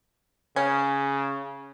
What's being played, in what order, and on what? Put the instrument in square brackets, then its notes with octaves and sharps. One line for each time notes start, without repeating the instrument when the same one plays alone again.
[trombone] C#3 [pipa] C#4